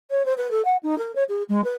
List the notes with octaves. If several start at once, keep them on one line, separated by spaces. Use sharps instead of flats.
C#5
C5
B4
A4
F#5
D#4
A#4
C#5
G#4
G#3
B4